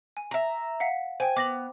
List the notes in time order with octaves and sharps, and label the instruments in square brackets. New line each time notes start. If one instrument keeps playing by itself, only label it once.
[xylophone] G#5
[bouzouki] E5 A#5
[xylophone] F5 F#5 B6
[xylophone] C5 G5 [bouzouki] G#5
[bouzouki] B3 [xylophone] D6 A#6 F#7